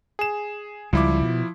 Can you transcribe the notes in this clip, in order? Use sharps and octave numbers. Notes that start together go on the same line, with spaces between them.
G#4 E7
C#2 F3 G3 E4 D6
B2